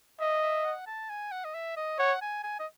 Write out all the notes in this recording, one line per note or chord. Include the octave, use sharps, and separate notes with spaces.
D#5 E5
E5
F#5
A5
G#5
F#5
D#5
E5
D#5
C#5 F#5
G#5
G#5
D#5